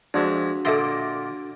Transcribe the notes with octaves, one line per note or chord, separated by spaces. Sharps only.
F2 G#3 D4 F#4 E5
A#2 D3 A4 D#5 E5 C6